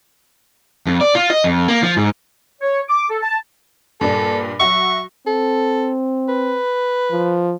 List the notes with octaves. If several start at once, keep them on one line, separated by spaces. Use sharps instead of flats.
F2
D5
F4
D#5
F2
A#3
F3
G#2
C#5
D6
A4
A5
G2 A#2 D4 A4
F#3 F#4 E5 C#6
C4 A4
B4
F3